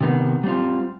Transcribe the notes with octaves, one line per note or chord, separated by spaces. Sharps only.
C3 D#3 B3
G3 C4 F4